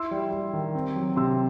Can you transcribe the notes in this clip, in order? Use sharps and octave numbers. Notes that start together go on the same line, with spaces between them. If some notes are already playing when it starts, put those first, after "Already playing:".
Already playing: E4 C6 E6
G3
G3
D#3
C4
F#3
C3 C6 E6